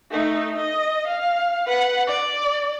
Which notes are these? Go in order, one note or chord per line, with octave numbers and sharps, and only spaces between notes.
A3 D#4
D#5
F5
B4 F#5
D5